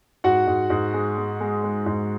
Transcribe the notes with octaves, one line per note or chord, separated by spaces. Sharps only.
G#2 F#4 F#5
G#2
G#2
G#3
G#3
G#3
G#3
G#2